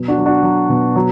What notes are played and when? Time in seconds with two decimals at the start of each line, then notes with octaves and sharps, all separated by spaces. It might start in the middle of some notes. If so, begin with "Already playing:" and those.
Already playing: B2 F#3
0.08 D4 F#4
0.18 F#3
0.26 D4 F#4
0.43 F#3
0.69 B2
0.96 F#3